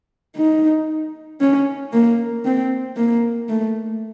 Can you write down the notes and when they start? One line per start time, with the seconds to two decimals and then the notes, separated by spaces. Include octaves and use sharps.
0.37 D#4
1.41 C#4
1.92 A#3
2.45 C4
2.97 A#3
3.49 A3